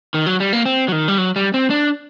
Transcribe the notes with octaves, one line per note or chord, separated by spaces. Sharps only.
D#3
F#3
G3
A#3
C4
F#3
D#3
G3
F#3
G3
C4
D4